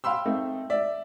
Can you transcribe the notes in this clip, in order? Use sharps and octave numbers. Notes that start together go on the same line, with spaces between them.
F5 G5 B5 C6 E6
A3 C4 D#4
D5 E5